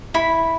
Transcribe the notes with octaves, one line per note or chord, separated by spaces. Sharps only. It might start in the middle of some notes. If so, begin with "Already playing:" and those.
E4 B5